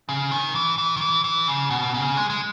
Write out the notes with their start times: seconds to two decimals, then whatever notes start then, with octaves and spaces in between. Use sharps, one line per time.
0.09 C#3
0.31 D#3
0.55 E3
0.78 E3
0.96 D#3
1.01 E3
1.24 E3
1.48 C#3
1.70 B2
1.94 C#3
2.17 G#3
2.30 G#3